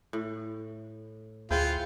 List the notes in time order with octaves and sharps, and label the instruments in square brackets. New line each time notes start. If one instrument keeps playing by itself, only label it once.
[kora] A2
[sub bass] D2 [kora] E4 C5 F#5 [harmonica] F4 [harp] G#4 G5 G6